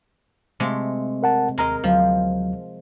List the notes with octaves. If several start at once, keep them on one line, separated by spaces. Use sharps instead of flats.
C3 G#3 A3
A#4 F#5 A5
D#2 G#3 A#4 D#5 A#5
D2 F3 F#3